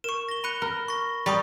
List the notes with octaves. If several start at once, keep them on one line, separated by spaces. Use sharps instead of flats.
A#4 C#6 E7
A#6 G7
B5 F#6 C#7 D#7
A#4
C#6 A#6
G3 A#5 B5 C#6 D#6